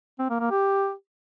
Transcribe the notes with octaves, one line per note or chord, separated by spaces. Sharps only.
C4
A#3
A#3
G4